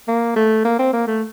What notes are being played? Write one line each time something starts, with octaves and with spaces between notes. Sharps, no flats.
A#3
A3
A#3
C4
A#3
A3